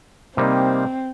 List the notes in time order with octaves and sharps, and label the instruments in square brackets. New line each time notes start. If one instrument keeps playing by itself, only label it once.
[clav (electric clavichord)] C3 G3 A#3 D#4 [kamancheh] C4